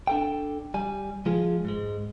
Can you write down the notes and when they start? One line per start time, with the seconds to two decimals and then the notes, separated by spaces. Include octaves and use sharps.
0.07 D4 A4 G5
0.74 G3 G#5
1.26 F3 G#3 F4 G#4
1.65 G#2 G#3